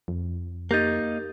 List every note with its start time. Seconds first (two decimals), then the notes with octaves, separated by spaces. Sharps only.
0.08 F2
0.71 A#3 D#4 G4 G6 A6